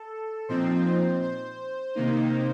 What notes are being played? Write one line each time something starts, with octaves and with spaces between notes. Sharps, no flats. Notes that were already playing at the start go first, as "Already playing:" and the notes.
Already playing: A4
A#2 F3 C4 D#4 C5
C5
C3 D#3 A#3 D#4